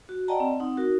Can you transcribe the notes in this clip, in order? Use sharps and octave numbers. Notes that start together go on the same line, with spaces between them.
F#4
D5 D#5 F#5 G5 A5 A#5
C4
C4 D#4 F#5
D#4 F#4 A#4